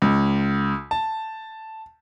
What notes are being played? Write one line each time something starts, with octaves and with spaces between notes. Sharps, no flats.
C#2
A5